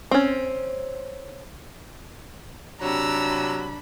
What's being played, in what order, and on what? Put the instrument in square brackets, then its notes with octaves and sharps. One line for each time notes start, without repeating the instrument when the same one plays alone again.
[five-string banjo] C4 C#4
[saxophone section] C3 F#3 [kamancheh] D4 B5 [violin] A#5 E6